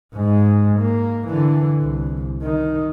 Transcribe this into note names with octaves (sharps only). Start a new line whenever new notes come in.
G#2 G#3
A#3
D3 E3
C2
D#3